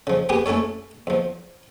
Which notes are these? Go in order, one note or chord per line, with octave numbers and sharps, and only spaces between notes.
C#3 F3
B3 G4 G#4 B4
A3 C#4 E4 A4 C#5
E2 F3